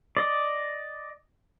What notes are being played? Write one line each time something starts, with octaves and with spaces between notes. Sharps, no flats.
D5 D#5